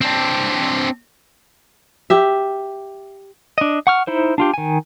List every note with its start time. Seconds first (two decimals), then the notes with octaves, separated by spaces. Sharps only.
0.01 C4 D4
2.10 G4 E5
3.58 D4 D#5
3.87 F#5 C#6 F6
4.07 D#4 E4 C5
4.38 D4 F4 G4
4.54 D#3 G#5